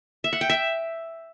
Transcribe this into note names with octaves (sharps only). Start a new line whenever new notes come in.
E5
F#5
G5
E5